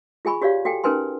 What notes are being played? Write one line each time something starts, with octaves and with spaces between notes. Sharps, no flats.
F4 G#4 G#5 B5 C#6
F#4 G4 C#5 D5 F5
F#4 A4 G5 G#5
C#4 D#4 A#4 B4 G#5 C6